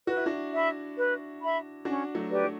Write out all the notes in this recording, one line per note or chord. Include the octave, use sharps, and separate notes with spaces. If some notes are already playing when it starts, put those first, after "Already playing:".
F#4 B4
E4
D4 F#4
E5 B5
B4
E5 B5
C#4 D4 F#4
F#3 A3
G4 B4 D5
F#3